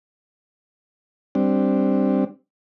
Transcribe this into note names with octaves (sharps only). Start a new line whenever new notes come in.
G3 C4 D4